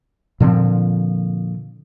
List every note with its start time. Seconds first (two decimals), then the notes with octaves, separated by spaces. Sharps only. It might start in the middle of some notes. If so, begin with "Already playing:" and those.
0.40 A#2 D3 F3 C4